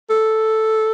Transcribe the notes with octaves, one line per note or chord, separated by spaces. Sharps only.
A4